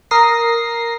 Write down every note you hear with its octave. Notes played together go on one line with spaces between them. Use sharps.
A#4 D#6 A#6 C7